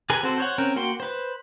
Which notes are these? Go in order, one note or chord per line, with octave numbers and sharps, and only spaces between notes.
G4 G#4 A#4 B4 G#5
C4 F#4 A4 C5
C5 C#5 F#5
C4 C#4 A#4 G5
A#3 F#4 F#5 G5 C6
B4 C5